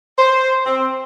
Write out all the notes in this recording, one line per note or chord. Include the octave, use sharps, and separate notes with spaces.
C5
C4